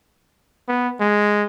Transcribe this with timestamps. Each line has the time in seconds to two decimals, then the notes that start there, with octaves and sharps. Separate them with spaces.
0.68 B3
1.01 G#3